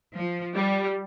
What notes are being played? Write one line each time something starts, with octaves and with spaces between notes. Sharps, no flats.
F3
G3